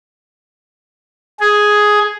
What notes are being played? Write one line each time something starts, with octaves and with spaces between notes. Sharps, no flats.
G#4